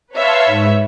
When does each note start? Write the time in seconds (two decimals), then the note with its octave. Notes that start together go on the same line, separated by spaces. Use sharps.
0.15 B4 C#5 E5 F5 A5 C6
0.46 G#2